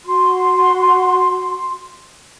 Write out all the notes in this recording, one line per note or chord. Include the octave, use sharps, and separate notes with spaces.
F#4 C6